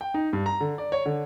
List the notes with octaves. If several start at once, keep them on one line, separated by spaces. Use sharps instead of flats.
G5
D#4
G2
A#5
D3
D5
C#5
D3